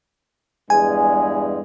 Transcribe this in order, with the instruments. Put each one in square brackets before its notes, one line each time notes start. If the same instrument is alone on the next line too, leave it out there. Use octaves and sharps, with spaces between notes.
[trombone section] E2 G2 G#3 [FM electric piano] G#5